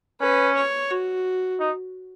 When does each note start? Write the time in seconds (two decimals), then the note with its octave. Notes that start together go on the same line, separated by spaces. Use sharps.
0.20 C#4 B4
0.55 C#5
0.90 F#4
1.60 D#4